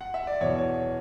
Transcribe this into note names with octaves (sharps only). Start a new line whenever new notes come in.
F#5
E5
D5
E2 B2 C#5
C#5